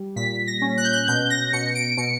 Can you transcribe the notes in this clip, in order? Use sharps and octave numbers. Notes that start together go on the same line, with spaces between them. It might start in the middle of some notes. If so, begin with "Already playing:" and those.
Already playing: G3
A#2 B6
A#6
C#4
F#6
G6
F#6
B2 G6
A#6
B2 C#7
D7
B2 C#7